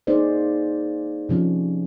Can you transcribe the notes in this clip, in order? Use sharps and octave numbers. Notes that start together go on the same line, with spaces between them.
A#3 D#4 G#4 C5 D5
C3 F3 C#4